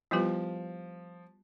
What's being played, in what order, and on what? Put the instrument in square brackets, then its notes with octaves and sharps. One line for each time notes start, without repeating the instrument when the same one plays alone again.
[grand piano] F3 [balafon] G3 B3 E4 G4 B4